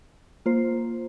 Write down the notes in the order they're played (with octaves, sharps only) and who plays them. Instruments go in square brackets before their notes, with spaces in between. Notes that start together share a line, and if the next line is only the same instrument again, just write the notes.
[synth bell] A#3 F4 C5